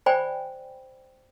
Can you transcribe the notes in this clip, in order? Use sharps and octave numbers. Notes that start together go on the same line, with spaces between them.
C5 D5 G5 G#5 B5